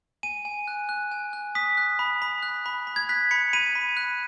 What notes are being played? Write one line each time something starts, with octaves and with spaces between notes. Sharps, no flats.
G#5 D#7
G#5
F#6
F#6
G#5
F#6
D#6 B6
F#6
B5
B5
F#6
B5
B5
G#6
F#6 B6
B5 C#7
B5 D#7
B5
F#6